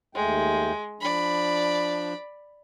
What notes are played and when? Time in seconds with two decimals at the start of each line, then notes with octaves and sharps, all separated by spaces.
0.15 D#2 G#3 A3 G5
1.01 F3 D4 D5 B5